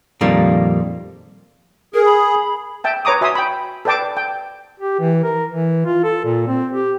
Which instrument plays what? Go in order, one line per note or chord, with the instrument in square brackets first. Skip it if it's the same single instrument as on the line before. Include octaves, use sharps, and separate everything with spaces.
[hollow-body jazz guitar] F2 A#2 D#3 G3 A#3 D#4
[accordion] G#4 [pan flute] A#4
[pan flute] B5
[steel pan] E5 G5 A5
B4 C#5 A#5 D6 D#6
F#4 E5 G#5 C6 D#6
G5 B5
A4 B4 D5 G5 A5 D6
G5
[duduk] G4
E3
A#4
E3
F4
A4
A#2
C4
G4